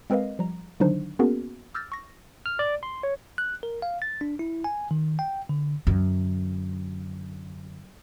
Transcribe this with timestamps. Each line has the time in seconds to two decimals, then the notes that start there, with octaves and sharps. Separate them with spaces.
0.10 G#3 C4 A#4 B4 D#5 F5
0.39 F3 G3 A#5
0.80 D3 D#3 F#3 D4 D#4 C5
1.19 A#3 B3 C#4 F#4 G#4 A#4
1.74 D6 E6 F6 G6 A6 A#6
1.92 C#6 A#6
2.46 F6
2.59 D5
2.83 C6
3.03 C#5
3.38 F#6
3.63 A#4
3.82 F5
4.02 A6
4.21 D4
4.39 E4
4.64 G#5
4.91 D#3
5.19 G5
5.49 D3
5.87 F#2 D3